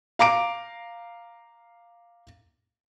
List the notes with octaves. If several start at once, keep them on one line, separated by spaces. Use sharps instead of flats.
F5 A#5 D6 D7